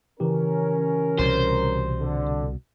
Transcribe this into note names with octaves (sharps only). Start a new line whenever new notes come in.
C#3 E3 C#4 G4 A#4
C2 B2 G3 C5
D3